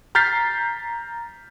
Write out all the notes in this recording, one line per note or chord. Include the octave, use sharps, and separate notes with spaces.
A#5 F6 G6 A6 B6 C7